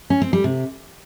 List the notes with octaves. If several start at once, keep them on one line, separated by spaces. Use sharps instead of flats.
C#4
C4
G3
C3